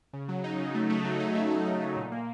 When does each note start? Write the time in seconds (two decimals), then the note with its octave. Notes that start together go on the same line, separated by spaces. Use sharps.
0.13 C#3
0.29 F#3
0.44 D#4
0.59 C#3
0.74 A3
0.90 A3
1.04 F#3
1.20 D#4
1.35 A3
1.50 D#4
1.66 A3
1.81 D#4
1.96 A#2
2.12 A#3